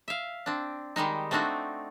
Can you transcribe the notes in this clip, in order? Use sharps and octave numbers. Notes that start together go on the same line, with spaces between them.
E5 F5
C4 D4
D#3 G3 G#3 D#4
A3 C4 D4 D#4 F#4